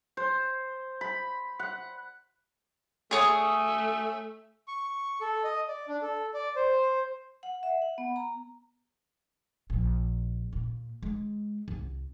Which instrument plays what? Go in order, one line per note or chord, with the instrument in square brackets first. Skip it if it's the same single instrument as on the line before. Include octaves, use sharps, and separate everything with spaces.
[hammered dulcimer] C5
B5
F#5
[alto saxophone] A3 [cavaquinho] G#4 C#5 D#6
[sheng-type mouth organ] C#6
A4
D#5
D5
D4
A4
D5
C5
[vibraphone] F#5
E5
F#5
B3
A#5
[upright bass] A#1
A#2
G#3
C2